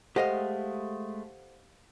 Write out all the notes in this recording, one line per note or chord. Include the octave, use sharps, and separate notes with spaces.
G#3 A3 G4 A4 C5 D#5 F5 F#5